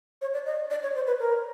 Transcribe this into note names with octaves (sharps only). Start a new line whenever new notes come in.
C#5
D5
D#5
D5
C#5
C5
B4
A#4